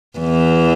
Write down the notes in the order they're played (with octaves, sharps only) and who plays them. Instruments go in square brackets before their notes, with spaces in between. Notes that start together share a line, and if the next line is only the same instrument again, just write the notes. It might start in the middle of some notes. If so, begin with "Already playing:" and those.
[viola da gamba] E2 E3